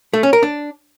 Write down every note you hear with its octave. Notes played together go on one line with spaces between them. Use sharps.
A3
C#4
A#4
D4